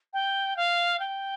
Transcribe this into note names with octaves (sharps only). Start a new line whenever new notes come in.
G5
F5
G5